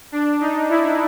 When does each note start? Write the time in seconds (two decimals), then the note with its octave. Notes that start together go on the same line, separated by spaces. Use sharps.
0.12 D4
0.41 D#4
0.70 E4